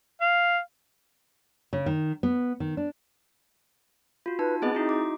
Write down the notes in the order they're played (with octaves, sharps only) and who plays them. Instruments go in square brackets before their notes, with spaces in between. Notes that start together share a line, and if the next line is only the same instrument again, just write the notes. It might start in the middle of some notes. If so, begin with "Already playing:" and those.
[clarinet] F5
[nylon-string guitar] C#3
D#3
B3
D#3
D4
[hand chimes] F4 F#4
[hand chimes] D#4 A5 [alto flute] B4
[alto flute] B3 [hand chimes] C4 G#4 D#5
[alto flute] D#4 [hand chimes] E4 F#4
[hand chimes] D6